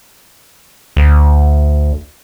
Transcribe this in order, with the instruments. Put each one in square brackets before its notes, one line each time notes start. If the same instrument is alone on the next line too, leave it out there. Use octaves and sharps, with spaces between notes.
[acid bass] D2